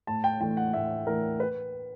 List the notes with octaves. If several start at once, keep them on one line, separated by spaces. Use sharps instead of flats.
A2 A5
G5
E3 A3 D4 G5
F#5
A2 E5
E3 A3 D4 A#4
B4